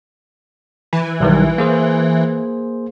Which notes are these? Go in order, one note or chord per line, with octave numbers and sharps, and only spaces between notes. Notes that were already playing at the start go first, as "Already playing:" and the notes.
E3
B1 D#3 G3
A#3 G#4 C5